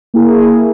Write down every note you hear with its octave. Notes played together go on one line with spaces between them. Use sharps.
A#3 E4 G#4